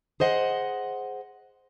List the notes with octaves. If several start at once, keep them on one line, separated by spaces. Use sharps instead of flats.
G#4 C5 D#5 F#5